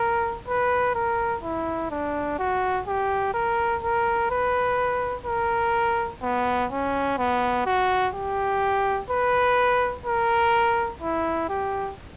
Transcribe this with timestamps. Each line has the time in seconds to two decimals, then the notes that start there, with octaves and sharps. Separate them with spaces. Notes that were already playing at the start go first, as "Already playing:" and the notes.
Already playing: A#4
0.47 B4
0.95 A#4
1.43 E4
1.91 D4
2.39 F#4
2.87 G4
3.34 A#4
3.83 A#4
4.30 B4
5.26 A#4
6.22 B3
6.71 C#4
7.18 B3
7.66 F#4
8.14 G4
9.10 B4
10.06 A#4
11.01 E4
11.49 G4